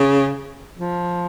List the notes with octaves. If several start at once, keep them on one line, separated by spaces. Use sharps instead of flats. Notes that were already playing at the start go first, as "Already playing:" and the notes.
Already playing: C#3
F3